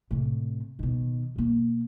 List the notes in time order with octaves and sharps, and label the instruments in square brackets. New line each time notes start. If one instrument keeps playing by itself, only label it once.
[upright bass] A2 C3
B2 D#3
B2 A#3